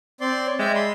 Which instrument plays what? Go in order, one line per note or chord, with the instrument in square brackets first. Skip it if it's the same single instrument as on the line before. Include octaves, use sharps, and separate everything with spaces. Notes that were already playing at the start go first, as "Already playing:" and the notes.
[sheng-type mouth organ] C4 D5 C6
[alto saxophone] C#5
[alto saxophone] G#3 [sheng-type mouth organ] D5 E5 G5
[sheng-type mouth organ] B5 C6